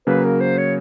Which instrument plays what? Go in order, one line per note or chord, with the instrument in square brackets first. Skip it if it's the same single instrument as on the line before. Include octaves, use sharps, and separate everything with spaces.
[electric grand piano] C#3 F#3 A#3 [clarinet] B4
[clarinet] A#4
C5
C#5